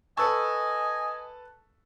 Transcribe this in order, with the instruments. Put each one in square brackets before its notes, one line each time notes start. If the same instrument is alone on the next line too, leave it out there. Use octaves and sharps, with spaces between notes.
[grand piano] A4 B4 A5 [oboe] D#5 [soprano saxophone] G#5 [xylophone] C#6 E6